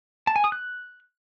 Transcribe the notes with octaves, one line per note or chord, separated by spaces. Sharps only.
A5
G#5
D#6
F#6